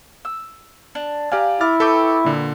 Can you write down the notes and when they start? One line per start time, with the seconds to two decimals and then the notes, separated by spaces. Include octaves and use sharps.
0.25 E6
0.95 D4
1.32 G4 D5 F5 G#5 A#5
1.61 E4 D6 F6 A6
1.80 A4 B4 G5 C#6 D6
2.25 A#2 D3